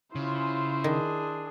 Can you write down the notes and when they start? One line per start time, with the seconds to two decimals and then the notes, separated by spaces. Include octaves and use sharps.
0.15 C#3 E4 F4 C5
0.84 D#3 D4 G#4